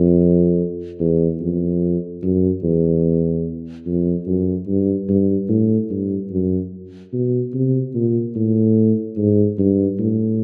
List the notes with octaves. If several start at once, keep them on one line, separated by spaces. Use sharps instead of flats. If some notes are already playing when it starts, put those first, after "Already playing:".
Already playing: F2
E2
F2
F#2
E2
F2
F#2
G2
G2
A2
G2
F#2
B2
C3
A#2
A2
G#2
G2
A2